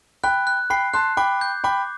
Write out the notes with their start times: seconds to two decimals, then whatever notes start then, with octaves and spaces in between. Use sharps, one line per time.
0.24 G5 B5 F#6
0.47 F#6
0.70 G5 B5 C7
0.94 A5 C6 F#6
1.17 G5 B5 D6
1.41 G6
1.64 G5 B5 D6